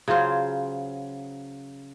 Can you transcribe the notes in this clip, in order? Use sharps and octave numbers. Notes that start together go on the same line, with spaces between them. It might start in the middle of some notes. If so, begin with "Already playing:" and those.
C#3 F#3 F4 C5